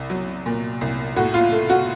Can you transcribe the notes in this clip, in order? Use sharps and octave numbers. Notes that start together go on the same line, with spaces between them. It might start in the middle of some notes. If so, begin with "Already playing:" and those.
Already playing: C2
F#3
A#2
C2
A2 F#4
F4
A3
F#4